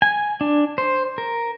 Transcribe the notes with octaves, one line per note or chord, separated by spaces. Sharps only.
G#5
D4
C5
A#4